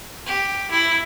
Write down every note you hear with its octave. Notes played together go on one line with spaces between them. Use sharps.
G4
E4